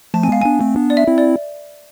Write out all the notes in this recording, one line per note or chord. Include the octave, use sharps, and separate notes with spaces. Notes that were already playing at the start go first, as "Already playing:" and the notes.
F3 A3 A5
C4 G#5
G#3 B3 F5
B3 D4 G#5
A3 C4
B3 D4
D5
E5
C4 E4
D5